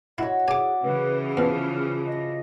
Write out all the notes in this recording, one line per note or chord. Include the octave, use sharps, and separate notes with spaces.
E4 F#4 C#5 D#5
G#4 D5 E5 G#5 D6
C#3 E3 B4
E2 F3 F6
D#5